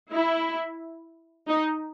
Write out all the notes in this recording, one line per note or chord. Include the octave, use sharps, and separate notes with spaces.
E4
D#4